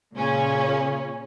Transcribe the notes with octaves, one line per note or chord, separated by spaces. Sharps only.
A#2 C#3 C#4